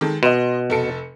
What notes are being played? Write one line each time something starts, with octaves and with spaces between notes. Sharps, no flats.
D#3 G#3 A4
B2 D#5 C6
F1 A4 C#7